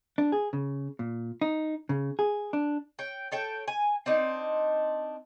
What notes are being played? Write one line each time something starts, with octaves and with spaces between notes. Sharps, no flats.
D4
G#4
C#3
A#2
D#4
C#3
G#4
D4
C#5 G5
A4 C#5 G5
G#5
C4 D4 D#4